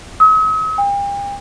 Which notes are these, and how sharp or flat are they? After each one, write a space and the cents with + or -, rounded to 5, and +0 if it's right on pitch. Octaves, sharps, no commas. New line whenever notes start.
D#6 +45
G5 +40